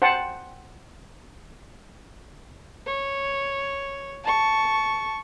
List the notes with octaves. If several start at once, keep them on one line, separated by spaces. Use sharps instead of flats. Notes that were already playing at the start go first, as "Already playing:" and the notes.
C5 F#5 G5 A5
C#5
A5 C#6